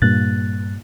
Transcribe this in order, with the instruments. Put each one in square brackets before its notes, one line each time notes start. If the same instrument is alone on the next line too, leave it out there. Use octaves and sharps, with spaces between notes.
[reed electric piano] G2 F#6 A6 [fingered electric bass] A#2 A#3